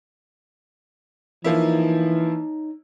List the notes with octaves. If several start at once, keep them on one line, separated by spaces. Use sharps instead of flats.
E3 F3 A#3 D#4 E4 C#5